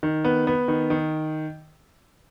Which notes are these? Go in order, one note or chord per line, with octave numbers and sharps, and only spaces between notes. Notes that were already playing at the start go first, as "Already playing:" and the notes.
D#3
B3
B3
D#3
D#3